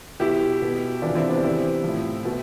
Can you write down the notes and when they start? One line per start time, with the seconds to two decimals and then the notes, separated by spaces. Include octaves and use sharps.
0.20 B2 E4 G4
0.62 B2
1.02 C3 E3 D4 F4
1.15 C4 E4
1.29 B3 D4
1.43 C3 E3 C4 E4
1.84 A2 F3
2.25 B2